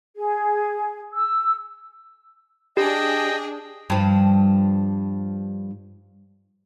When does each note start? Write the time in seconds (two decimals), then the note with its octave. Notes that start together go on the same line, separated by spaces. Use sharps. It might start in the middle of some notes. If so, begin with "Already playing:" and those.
0.16 G#4
1.14 E6
2.77 D4 G4 G#4 D#5 G5
3.90 G2 F3